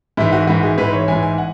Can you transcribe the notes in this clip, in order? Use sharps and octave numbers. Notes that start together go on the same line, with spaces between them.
G#2 E3 E4
F#4
G#2 E3 F#4
G#4
G#2 E3 B4
C#5
G#2 E3 G#5
G#5
F#5